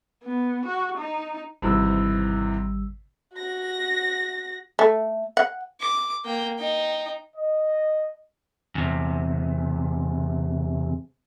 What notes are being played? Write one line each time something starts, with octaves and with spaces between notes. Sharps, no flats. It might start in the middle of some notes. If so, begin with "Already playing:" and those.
B3
F#4
D#4
G#1 G#2 C3 E3 G3 E6
F#4 A#6
A3
F#5
D6
A#3 G5
D#4 G5
D#5
E2 C3